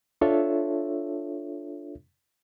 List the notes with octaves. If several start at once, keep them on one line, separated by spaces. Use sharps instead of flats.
D4 F4 A4 C#5 E5